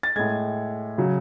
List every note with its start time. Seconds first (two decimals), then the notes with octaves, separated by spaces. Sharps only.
0.03 A6
0.16 A2 G#3 G#6
0.98 C#3 F#3